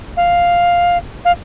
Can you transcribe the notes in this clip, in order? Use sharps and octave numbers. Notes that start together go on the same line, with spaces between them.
F5
F5